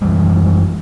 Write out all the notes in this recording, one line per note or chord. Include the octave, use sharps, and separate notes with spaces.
F#2 E3 G3 G#3